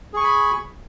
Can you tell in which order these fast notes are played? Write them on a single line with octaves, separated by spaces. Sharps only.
G#4 C#6 G#5 B5